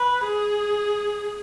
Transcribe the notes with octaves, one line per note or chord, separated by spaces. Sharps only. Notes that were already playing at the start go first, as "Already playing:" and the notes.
Already playing: B4
G#4